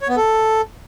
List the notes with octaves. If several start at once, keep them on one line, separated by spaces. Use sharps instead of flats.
C#5
B3
A4